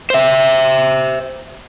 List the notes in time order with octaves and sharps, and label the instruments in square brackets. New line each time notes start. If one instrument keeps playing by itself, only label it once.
[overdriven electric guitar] C5 E5